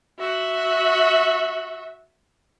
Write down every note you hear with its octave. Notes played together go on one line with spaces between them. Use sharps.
F#4 E5